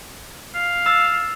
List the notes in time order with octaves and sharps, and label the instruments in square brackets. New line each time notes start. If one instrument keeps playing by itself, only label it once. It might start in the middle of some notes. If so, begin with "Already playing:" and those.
[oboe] F5
[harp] E6 A6